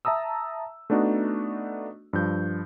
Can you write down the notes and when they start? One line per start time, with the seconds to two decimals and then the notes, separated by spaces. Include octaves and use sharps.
0.05 E5 A5 A#5 D#6 E6
0.90 A3 B3 D4 D#4 F#4 D#5
2.13 G2 F3 G6